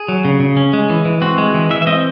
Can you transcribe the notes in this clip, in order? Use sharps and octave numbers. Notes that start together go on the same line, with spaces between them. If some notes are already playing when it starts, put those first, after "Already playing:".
Already playing: G#4
F#3
C#3
C#3
C#4
G#3
E3
E3
C4 F#4
G#3
E3
E3 E5
E5
C4 D#5